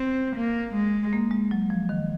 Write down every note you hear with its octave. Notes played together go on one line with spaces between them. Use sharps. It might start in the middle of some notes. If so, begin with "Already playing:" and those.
Already playing: C4
A#3
G#3
A#3
G#3
F#3
F3
D#3